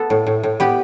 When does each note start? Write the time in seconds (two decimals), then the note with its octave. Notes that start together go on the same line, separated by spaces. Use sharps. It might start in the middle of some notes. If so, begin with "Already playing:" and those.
Already playing: A3 B3 A4
0.10 A2
0.27 A2
0.43 A2
0.60 B3 G4